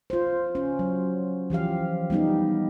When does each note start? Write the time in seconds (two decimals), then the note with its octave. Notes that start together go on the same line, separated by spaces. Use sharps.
0.10 F4 C5
0.55 C#4
0.79 F#3
1.50 E3 F3 G4 F5
2.10 G3 B3 D#4 G4